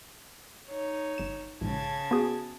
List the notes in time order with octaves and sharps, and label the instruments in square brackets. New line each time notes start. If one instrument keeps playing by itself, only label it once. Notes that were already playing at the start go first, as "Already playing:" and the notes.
[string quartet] D#4 C#5
[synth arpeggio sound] G1 E7
[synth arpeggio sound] A#1 G#2 [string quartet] C#3 A5 G#6
[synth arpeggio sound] B3 F#4 G#4